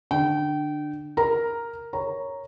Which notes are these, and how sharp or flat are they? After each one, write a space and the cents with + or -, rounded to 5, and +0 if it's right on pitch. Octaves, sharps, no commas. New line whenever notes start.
D3 +20 G5 -30
A#4 +0 A#5 +0
A#4 +0 C#5 +0 A#5 +0